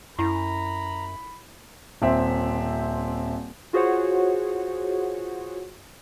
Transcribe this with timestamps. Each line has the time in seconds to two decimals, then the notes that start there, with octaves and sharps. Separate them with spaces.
0.19 F#2 E4 A#5 B5
2.02 D#1 C4 E5
3.73 F4 F#4 G#4 C5 C#5 F#5